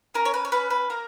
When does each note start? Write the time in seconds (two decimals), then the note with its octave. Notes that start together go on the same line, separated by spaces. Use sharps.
0.14 C#4 A#4
0.25 C#5
0.34 B4
0.45 C#5
0.52 C#4 B4
0.70 B4
0.90 A#3 A#4